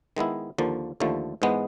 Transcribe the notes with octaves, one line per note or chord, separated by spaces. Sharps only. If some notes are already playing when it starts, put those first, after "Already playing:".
D#3 G#3 B3 E4
D#2 D3 F3 A#3
D#2 D3 F3 A3
G#2 E3 G#3 B3